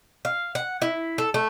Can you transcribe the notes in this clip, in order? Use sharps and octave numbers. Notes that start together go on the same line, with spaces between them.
F5
F#5
E4
A4
A3